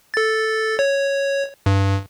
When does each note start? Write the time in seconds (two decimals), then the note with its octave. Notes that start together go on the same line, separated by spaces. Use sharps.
0.14 A4 A6
0.79 C#5
1.66 G2